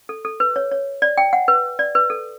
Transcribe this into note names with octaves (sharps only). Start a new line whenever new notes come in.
A4
A4
B4
C#5
C#5
D5
G5
F#5
B4
D5
B4
A4